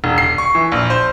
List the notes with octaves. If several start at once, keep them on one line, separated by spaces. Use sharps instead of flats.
E1
C7
C#6
E3
A#1
C5